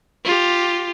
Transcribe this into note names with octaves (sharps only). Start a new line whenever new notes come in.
F4 G4